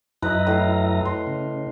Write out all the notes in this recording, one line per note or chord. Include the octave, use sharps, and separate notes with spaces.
F#2 E4 B4 D#5 A#5
A2 F5
C6
C#3